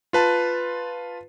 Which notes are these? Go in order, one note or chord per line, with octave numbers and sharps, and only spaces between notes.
F4 B4 A5